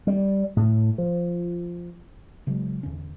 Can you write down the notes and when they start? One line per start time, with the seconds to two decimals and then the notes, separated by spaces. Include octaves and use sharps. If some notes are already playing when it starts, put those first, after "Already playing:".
0.07 G3
0.57 A2
0.98 F3
2.47 C#3 F#3 G#3
2.83 E2 D3 C#4